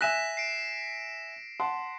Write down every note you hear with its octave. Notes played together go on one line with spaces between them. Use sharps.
E5 G#5 F#6 A#6 B6 E7
C7 D7
F#5 A5 C6